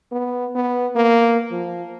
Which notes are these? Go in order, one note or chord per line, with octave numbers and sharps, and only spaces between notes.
B3
B3
A#3
F3